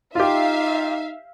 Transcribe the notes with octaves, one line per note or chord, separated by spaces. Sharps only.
D#4 F4 G4 E5 F5